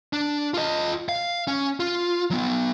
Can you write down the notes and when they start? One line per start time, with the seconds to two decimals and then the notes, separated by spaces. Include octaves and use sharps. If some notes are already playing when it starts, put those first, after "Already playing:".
0.13 D4
0.54 F4 D#5
1.09 F5
1.47 C#4
1.80 F4
2.30 F#3 B3